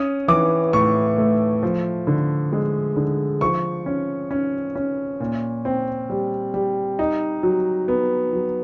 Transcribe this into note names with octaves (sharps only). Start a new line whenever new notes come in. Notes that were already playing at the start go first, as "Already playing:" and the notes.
Already playing: C#4 D#6
E3 D6
A2 C#6
A3
F3
D3
G#3
D3
F3 C#6
C#4
C#4
C#4
A#2
C4
G3
G3
D#4
F#3
B3
F#3